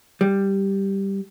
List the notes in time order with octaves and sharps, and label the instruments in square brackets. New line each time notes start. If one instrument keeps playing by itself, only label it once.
[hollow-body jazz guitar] G3